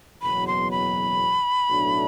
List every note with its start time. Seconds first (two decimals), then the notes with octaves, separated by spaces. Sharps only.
0.22 F#1 E2 B2 F#3 B5
0.47 C6
0.71 B5
1.70 B1 A2 F#3 A3 D4